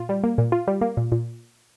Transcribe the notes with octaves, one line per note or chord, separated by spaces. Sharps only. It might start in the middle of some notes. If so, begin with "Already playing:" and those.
Already playing: A#2 F4
G3
A#3
A#2
F4
G3
A#3
A#2
A#2